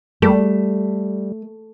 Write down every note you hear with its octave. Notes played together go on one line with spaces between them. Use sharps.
G3 A3